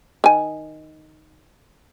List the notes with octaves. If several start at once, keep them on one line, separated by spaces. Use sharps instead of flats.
D#3 G#5